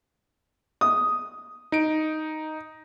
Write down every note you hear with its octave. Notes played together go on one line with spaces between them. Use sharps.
D#6
D#4 D7